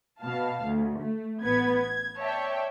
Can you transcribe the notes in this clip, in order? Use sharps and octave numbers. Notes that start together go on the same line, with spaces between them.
B2 F5 A5
D2
A3
A1 B3 B4 G#6
G#6
C#5 D5 E5 G5 A5